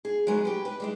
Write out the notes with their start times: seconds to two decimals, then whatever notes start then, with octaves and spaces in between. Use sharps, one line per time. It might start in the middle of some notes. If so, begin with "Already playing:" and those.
0.05 G#4
0.27 F#3 G#3 B3
0.45 G4 B4
0.65 B4
0.80 G3 G#3 E4